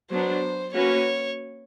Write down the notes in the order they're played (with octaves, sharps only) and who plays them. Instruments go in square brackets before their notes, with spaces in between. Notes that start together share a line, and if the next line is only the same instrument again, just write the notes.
[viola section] F#3 B3 D4 [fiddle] C5
[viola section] A#3 C#4 F#4 B4 [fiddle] C#5